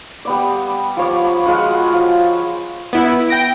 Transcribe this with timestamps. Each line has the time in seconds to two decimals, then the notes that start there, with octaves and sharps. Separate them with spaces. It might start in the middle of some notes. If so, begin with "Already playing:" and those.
0.25 G3 B3 D5
0.97 F3 C#5 D6
1.23 B5
1.46 G#3 F4 F#4 F#5
1.93 F3
2.93 B3 E4
3.28 G5 A#6 D7